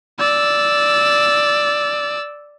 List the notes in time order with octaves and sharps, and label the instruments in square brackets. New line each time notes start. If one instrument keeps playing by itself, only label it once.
[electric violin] D5 E6